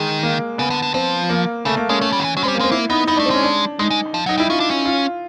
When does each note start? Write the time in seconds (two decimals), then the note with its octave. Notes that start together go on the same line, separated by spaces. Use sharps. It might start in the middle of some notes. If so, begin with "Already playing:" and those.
Already playing: D#3 G#3
0.23 A#3
0.58 C#3 B3
0.70 D3
0.82 D3
0.94 F3 C4
1.30 A#3
1.65 C#3 A3
1.77 A#3
1.89 G#3 C#4
2.01 A3 C#4
2.12 G3
2.20 D#3
2.24 E3
2.36 F#3 C#4
2.43 G3 G#3 C4
2.55 A#3
2.60 G#3 C4
2.71 A#3 E4
2.90 B3 D#4
3.07 B3 D#4
3.17 A3 D4
3.26 C4
3.31 G#3 C#4
3.43 D4
3.79 G#3 D#4
3.90 G#3
4.14 F3
4.26 F#3 D#4
4.37 G3 E4
4.50 C#4 F4
4.60 D4
4.71 C#4
4.85 F4